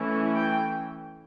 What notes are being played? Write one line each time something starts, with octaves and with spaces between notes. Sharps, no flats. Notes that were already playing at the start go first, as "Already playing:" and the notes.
Already playing: E3 A3 C#4 E4
G5